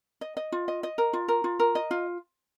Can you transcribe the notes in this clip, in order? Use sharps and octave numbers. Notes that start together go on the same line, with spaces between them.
D#5
D#5
F4
D#5
D#5
A#4
F4
A#4
F4
A#4
D#5
F4